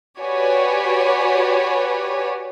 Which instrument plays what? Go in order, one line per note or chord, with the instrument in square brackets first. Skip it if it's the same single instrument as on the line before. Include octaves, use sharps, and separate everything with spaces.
[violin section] F#4 G4 B4 C#5 D5 G#5